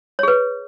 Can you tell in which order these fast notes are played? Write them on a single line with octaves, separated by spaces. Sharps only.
C#5 G#4 B4